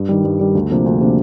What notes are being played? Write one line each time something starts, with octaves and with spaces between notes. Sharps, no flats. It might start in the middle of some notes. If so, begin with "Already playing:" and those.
Already playing: G2
D#3 G3
G2
D#3 G3
D2
C3 F3 A#3 D4
D2
C3 F3 A#3 D4